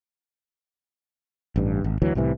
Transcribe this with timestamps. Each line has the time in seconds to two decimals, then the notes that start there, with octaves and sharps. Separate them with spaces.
1.56 A1 G2
1.84 G#1
2.02 D2 E3 F#3
2.15 C2 A2 C3 E3